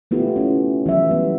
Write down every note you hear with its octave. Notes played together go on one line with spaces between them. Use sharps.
A3 B3 E4 F4 G4
C#4
E3 F#3 E5
G3 B3